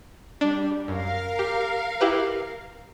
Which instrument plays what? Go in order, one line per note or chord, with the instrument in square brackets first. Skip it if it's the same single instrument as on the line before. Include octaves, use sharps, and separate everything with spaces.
[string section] G3 [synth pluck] D4
[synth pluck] F#2 [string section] A#4 F5
[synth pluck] G4
E4 G4 B4